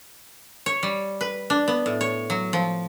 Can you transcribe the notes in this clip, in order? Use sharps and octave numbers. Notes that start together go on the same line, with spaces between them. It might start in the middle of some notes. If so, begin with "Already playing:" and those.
C#5
G3
B4
D4
B3
A2
C#5
F#3
F3